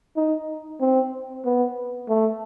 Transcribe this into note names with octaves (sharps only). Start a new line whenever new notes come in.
D#4
C4
B3
A3